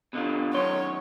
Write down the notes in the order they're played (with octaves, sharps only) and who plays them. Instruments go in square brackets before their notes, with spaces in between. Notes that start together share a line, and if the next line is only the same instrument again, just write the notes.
[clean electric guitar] B2 D3 F4
[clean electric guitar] F#2 D#3 C6 [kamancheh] C#5